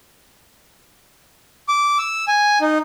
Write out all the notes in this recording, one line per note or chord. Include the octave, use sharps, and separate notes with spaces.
D6
E6
G#5
D#4